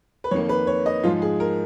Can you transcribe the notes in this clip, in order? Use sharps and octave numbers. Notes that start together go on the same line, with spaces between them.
B4
F2 D#3 A#3 C#5
B4
C#5
D#5
G#2 F3 G#3 F4
G#4
A#4